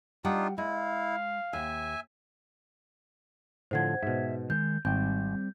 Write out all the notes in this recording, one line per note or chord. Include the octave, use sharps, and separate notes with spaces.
G3 D4 D#4 F4 F#5 G5
G#3 E4 F5
D#2 E5 G#5
A2 D3 F3 C5 F#5 G#6
G#2 B2 E5
D#3 G#3 G6
G#1 G3 C4 G5 G6